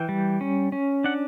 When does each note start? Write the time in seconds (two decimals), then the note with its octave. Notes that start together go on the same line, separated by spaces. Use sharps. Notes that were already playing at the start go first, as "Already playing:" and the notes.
Already playing: E3 G5
0.09 G3
0.41 C#4
0.72 C#4
1.04 D4 F#5